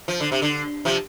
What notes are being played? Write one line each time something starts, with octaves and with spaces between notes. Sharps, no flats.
F3
D3
C3
D3
C3 F3